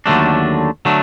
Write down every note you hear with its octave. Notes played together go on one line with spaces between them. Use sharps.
D#2 D3 F#3 A3 D4
D3 F#3 A3 D4